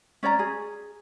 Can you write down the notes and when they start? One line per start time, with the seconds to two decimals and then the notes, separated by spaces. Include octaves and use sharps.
0.23 C#4 C#5 D5 A#5
0.39 G#4